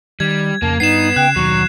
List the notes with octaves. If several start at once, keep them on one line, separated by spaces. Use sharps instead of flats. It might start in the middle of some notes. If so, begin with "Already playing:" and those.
D#3 G3 G#6
F2 C#3 A#3 A5
G2 B3 D#4 C7 E7
C#3 G5 F#6
D#2 B2 D#3 F#3 C#6